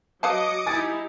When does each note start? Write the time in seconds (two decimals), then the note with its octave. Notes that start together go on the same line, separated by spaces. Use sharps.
0.23 F#3 B4 D#5 F5 A5 D6 D#6 C#7
0.66 D#4 E4 G4 G#5 A6